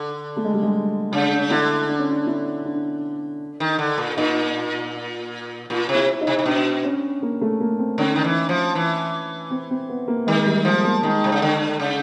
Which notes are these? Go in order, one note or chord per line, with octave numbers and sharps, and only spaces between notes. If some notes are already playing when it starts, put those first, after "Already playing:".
Already playing: D3
A3
G#3
G3
G#3
C#3 D4
D3 E4
D4
C#4
D4
E4
D4
D#3
D3
A#2
A#2 D#4
A#2 F4
C3
E4
D#4
C3
C3
B2 D4
C#4
A#3
A3
A#3
C4
D3 C#4
D#3
E3
F3
E3
C4
C4
B3
A#3
D#3 G#3
G3
F3 G#3
A#3
D#3 G#3
C3
C#3
D3
C#3